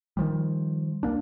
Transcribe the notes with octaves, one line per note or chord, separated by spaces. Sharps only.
D#3 F3 G3
D#2 G#2 A#3 D4